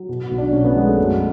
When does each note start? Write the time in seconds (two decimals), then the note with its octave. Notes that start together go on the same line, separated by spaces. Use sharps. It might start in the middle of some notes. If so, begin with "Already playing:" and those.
Already playing: F#3
0.09 B2
0.24 F#4
0.31 B1
0.38 D4
0.53 B1 C#4
0.65 B3
0.76 F#3 G#3
0.87 A3
0.98 F#2